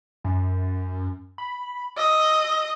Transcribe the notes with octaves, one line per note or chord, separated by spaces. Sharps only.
F#2
B5
D#5 E6